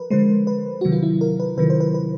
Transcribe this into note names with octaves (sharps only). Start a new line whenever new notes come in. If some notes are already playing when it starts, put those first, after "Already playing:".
Already playing: F3 A#4 B4
D3 F3 G#3 C5
B4
C3 D#3 F#3 F#4
F4
E4
A#4
B4
C3 D#3 F#3 B4
C5
B4
B4